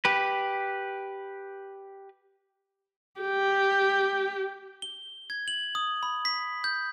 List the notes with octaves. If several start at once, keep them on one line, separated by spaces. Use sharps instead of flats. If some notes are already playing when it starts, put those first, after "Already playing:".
G4 B4
G4
G7
G#6
F#7
D#6
B5
B6
G6